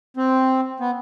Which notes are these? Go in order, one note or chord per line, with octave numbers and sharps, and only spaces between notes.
C4
B3